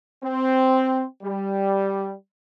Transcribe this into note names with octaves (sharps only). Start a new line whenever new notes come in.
C4
G3